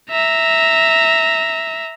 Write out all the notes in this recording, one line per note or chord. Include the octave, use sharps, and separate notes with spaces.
E5 A#5